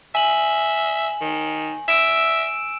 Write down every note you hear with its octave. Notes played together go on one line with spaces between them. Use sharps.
E5 G#5 F#7
D#3
E5 E6 D7 E7